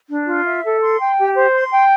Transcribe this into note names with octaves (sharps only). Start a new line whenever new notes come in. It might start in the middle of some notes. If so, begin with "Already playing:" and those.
D4
F4
E5
A4
C6
G5
G4
C5
C6
G5